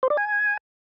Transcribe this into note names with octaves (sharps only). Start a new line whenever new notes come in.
C5
D5
G#5